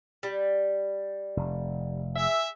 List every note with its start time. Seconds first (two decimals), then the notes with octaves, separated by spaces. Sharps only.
0.23 G3
1.37 F1
2.16 G#4 E5